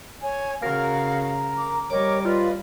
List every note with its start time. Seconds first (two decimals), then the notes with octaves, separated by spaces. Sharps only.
0.23 C#5 G#5
0.62 C#3 F#4 A#4 F5
1.58 D6
1.90 G3 A#4 C#5 D#5 D6
2.25 F4 B4 D5 D#5